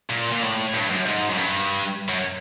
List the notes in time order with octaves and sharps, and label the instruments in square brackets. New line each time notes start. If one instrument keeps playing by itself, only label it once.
[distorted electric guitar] A#2
A#2
A2
G2
F#2
G#2
F#2
G2
F#2